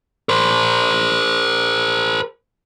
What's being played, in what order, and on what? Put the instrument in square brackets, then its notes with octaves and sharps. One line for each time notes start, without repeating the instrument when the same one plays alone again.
[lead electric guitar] A#4 C5